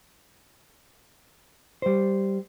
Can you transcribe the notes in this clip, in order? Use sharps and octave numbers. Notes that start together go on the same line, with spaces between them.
G3 C5